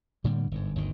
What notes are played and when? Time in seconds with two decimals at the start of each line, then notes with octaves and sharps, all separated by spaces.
0.24 A2 D3 G3 A#3
0.52 G1 G#2
0.76 G1 D2 D#3